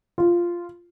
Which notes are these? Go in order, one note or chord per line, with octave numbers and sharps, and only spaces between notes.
F4